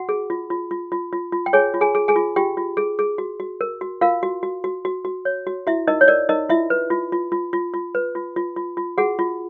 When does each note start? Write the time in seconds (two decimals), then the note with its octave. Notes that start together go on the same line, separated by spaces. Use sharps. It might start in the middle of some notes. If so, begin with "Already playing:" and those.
Already playing: F#4 F#5
0.09 G#4
0.30 F4
0.50 F4
0.71 F4
0.92 F4
1.13 F4
1.32 F4
1.46 G5
1.53 G#4 C#5 G#5
1.74 F4
1.81 G#4 G#5
1.95 G#4
2.08 G#4 G#5
2.16 F4
2.36 F4 G4 G5
2.57 F4
2.77 G#4
2.99 G#4
3.18 F#4
3.40 F#4
3.61 A#4
3.81 F#4
4.01 F4 A#4 F5
4.23 F#4
4.43 F#4
4.64 F#4
4.85 F#4
5.05 F#4
5.25 C#5
5.47 F#4
5.67 E4 F#4 E5
5.87 D#4 A#4 D#5
6.01 C#5
6.08 A#4 D5
6.29 D#4 A#4 D#5
6.49 E4 F4 E5
6.70 B4
6.90 F4
7.12 F4
7.32 F4
7.53 F4
7.74 F4
7.95 B4
8.15 F4
8.36 F4
8.56 F4
8.77 F4
8.98 F#4 G#4 F#5
9.19 F4